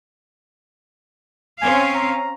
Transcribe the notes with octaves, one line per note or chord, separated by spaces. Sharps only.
C4 C#4 F5 G#5
A#5